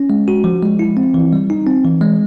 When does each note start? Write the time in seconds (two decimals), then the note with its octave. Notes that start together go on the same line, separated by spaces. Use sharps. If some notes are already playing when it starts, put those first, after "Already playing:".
Already playing: C#4
0.10 G#3
0.28 F#4
0.44 F3
0.62 G#3
0.79 E4
0.97 C4
1.14 E3
1.33 G3
1.50 D#4
1.67 C4
1.85 E3
2.01 G#3